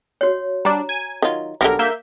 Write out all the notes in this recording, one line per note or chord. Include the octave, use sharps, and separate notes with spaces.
F#4 C#5
G3 D4 A#5
G#5
D#3 F#3 F4
B1 D3 F#3 G3 A#4
A#3 E5 G6